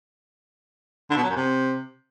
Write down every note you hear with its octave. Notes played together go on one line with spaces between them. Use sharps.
D3
B2
F#3
F#2
C3